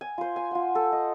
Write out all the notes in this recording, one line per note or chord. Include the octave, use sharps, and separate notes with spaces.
G#5
F4 C5
G#5
F4 F#5
A4
D#5